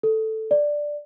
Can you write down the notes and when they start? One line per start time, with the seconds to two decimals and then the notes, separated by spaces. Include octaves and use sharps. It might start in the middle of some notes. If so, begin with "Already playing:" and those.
0.03 A4
0.51 D5